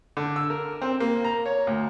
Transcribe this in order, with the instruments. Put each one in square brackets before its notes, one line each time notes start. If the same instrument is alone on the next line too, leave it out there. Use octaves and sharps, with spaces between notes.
[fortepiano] D3
E6
A#4
C4
A#3
A#5
C#5
D2